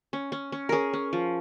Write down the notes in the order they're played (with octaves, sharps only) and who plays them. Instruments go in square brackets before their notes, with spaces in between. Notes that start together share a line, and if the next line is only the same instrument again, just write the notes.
[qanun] C#4
C#4
C#4
C#4 G#4 A#4
C#4
F3